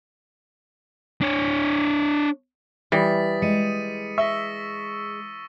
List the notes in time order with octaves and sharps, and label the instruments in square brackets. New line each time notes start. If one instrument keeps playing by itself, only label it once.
[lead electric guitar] D4 C#5
[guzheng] E3 [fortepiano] G3 [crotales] D#6 A6 B6
[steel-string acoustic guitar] G#3 [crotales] C#7 D#7
[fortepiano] E5 [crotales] C#6 E6 A#6